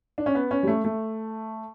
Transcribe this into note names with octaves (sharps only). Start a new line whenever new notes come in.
D4
C#4
B3
C#4
G3
A3
A3